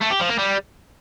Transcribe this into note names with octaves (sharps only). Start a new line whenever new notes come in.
A3
G4
F3
A#3
G3